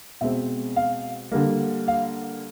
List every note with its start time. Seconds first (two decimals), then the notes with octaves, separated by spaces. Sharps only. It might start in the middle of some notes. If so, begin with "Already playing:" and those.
0.21 B2 G#3 C4 E5
0.76 F5
1.32 D3 G3 A#3
1.88 F5